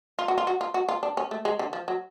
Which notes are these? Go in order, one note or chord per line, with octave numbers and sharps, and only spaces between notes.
F4
F#4
F4
F#4
F4
F#4
F4
D4
C#4
A3
G#3
D3
F3
F#3